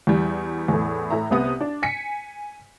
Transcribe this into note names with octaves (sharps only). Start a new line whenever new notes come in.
E2 E3 G3
E2 A2
A2 E5 A#5
C2 C3 B3 D#6
D4
G#5 B6 C#7